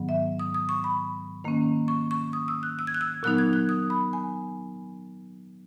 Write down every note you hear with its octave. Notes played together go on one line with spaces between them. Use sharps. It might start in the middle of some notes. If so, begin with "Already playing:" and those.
Already playing: G#2 D#3 F#3 B3
E5
D#6
D#6
C#6
B5
D#3 A#3 C#4
C#6
C#6
D#6
E6
F#6
E6
G#6
F#6
E6
A#2 F#3 B3 D#4 F#6
G#6
F#6
D#6
B5
G#5